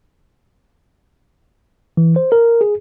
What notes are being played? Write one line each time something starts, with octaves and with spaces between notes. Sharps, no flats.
E3
C5
A#4
G#4